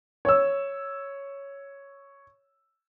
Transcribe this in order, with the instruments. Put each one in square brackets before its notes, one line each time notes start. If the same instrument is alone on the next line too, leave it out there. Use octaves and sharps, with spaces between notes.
[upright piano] C#5 E6